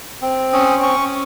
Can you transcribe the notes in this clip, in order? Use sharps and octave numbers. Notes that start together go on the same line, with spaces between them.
C4
C#4 D#6
C#4 C#6